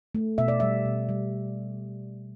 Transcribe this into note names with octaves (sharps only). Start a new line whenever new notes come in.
A3
B2 E5
D5
G3 E5
B2
G3